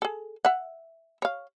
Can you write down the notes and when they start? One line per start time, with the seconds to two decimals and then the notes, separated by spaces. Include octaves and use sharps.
0.02 G#4 A4
0.45 E5 F#5
1.22 C#5 F5